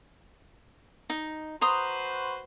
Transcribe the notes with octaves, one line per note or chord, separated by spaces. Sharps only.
D#4
F#4 B4 C5 A#5 C6 D#6